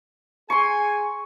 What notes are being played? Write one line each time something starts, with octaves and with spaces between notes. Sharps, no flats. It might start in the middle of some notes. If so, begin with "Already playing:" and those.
G#4 G#5 C6 C#6